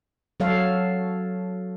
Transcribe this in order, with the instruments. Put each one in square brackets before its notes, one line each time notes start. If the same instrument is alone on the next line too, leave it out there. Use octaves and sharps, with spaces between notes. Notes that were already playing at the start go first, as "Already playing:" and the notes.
[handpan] F#3 A4 C#5 F5